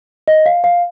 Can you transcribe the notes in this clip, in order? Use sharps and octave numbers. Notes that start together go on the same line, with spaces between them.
D#5
F5
F5